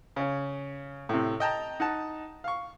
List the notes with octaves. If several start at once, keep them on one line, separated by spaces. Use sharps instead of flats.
C#3 C#4
A2 C3
D#5 G5 A5 A#5
D#4 F#5 A5
F5 C#6